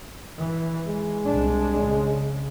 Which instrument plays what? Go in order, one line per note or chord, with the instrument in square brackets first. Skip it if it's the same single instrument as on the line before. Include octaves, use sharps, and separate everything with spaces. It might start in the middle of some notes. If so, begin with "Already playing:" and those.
[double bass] E3
[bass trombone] G#3
[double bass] C2 D4
C#3